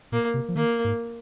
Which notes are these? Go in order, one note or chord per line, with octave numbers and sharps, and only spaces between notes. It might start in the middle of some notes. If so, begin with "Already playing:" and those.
A#2 A#3
C3
F3
D#3 A#3
G#2